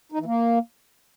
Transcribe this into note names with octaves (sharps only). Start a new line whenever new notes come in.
D#4
E3
A#3